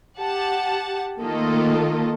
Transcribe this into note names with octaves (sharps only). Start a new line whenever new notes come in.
G4 F#5 A5
D#3 A3 A#3 F4 A4 D#5